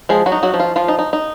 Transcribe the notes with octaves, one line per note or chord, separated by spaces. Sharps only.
F3 G#3 G#4
F#3 F#4
D#4
F#3 F#4
F3
F4
F3 F4
D#4
D#4
D#4